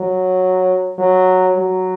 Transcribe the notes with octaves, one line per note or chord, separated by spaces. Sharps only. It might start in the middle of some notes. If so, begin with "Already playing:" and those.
Already playing: F#3
F#3
F#3